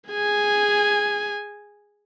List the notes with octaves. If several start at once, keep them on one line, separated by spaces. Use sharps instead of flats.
G#4 G#5